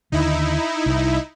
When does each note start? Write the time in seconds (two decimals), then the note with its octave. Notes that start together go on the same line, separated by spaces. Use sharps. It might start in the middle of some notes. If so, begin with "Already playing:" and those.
0.12 D#2 D3 D#4 E4
0.86 C2